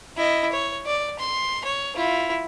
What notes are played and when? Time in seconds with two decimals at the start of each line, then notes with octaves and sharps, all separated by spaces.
0.17 E4 D#5
0.52 C#5
0.86 D5
1.19 C6
1.65 C#5
1.96 E4 F4